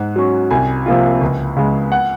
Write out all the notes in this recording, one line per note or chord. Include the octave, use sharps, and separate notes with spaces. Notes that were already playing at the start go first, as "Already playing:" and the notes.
Already playing: G#2 F#5
F#3 C#4
C2 G#5
C3 F3 A#3 F4
C#2
C#3 G#3
F#5